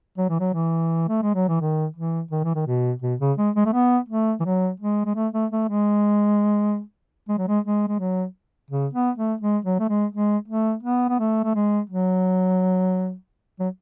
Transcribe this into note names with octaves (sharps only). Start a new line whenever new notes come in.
F#3
E3
F#3
E3
A3
G#3
F#3
E3
D#3
E3
D#3
E3
D#3
B2
B2
C#3
G#3
G#3
A3
B3
A3
E3
F#3
G#3
G#3
A3
A3
A3
G#3
G#3
F#3
G#3
G#3
G#3
F#3
C#3
B3
A3
G#3
F#3
A3
G#3
G#3
A3
B3
B3
A3
A3
G#3
F#3
F#3